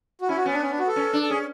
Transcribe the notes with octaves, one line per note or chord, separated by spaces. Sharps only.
F#4
C#4 E4
F#4
B3 C#4
D4
C#4
D4
F#4
A4
C#4
D4
A4
C#4 G#4